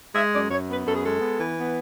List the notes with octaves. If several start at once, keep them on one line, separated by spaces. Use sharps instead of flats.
G#3 E5
F#2 D5
F#2 C#5
B3 B4
F#2 A4
G#4
G#3 A4
B3
E3
B3